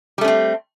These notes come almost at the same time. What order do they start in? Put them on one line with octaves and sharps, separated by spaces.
G3 A3 C#4 C4